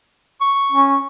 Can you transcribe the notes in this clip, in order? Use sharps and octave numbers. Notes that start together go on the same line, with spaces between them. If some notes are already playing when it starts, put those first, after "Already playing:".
C#6
C#4